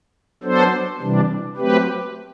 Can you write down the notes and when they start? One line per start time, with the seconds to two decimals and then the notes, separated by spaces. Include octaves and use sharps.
0.43 F#3 B3 D4 A4 C5
1.00 C3 E3 G3 D4
1.57 F#3 A3 C4 G4 B4